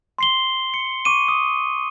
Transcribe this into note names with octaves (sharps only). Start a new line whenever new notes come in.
C6 C7 G7
C#7
C#6 D6 D#7
D#6